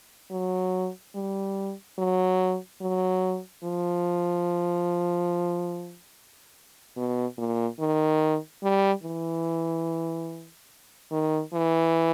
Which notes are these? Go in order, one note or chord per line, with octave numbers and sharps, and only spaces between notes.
F#3
G3
F#3
F#3
F3
B2
A#2
D#3
G3
E3
D#3
E3